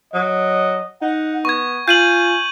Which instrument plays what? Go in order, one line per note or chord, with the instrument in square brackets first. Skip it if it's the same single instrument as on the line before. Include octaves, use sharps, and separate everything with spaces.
[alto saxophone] F#3 [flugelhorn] D#5
[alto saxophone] D#4 [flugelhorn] F#5
[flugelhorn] B3 [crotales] C#6 G#6
[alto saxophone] F4 [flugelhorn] G#5 [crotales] G6 D#7 F#7